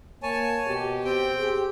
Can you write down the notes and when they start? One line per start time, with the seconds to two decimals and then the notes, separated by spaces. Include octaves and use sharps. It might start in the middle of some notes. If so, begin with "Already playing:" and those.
0.23 A#3 C#5 G#5 A5
0.67 B2 G4
1.05 C4 G5
1.36 G4 G#4